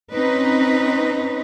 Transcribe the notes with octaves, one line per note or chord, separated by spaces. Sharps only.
C4 C#4 D#4 B4